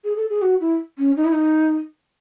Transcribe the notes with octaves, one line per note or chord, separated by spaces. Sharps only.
G#4
A4
G#4
F#4
E4
C#4
D#4
E4
D#4